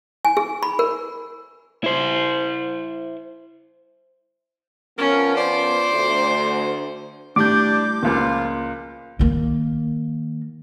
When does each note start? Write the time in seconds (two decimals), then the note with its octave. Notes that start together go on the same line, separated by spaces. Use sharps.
0.25 G#5
0.37 G#4
0.63 B5
0.79 A#4
1.84 E4 C5
4.98 F3 B3 C#4 A#4
5.37 C5 D5
5.91 D2
7.36 A2 G3 D4 D6 G6
8.03 C#2 A#2 F3 F4
9.19 D#3 A#3